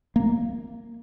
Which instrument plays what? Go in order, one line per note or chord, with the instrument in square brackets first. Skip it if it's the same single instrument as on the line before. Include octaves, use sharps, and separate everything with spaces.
[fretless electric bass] A#3